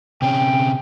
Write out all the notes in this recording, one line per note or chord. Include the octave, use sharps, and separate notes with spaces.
C3 C#4 G5